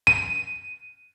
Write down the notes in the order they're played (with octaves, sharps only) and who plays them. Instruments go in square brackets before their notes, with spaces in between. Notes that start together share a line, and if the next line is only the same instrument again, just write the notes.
[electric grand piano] D#7